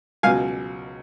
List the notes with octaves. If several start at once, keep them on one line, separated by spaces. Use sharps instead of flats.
C#2 B2 F#3 F5 G#5